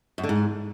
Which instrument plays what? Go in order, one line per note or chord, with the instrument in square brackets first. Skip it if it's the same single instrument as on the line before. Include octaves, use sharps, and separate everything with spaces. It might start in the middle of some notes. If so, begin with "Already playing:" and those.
[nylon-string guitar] F#2
D3
G#2